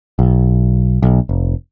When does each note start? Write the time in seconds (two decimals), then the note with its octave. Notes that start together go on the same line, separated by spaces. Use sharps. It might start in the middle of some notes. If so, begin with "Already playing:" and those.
0.19 B1
1.03 B1
1.29 F1